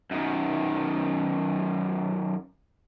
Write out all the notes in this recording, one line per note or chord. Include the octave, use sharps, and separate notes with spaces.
F#2 D#3